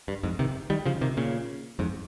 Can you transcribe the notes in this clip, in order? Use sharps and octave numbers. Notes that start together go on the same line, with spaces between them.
G2
F2 G#2
C3 D#3
D#3 G3
C#3 F3
C3 D#3
A#2 C#3
F2 G#2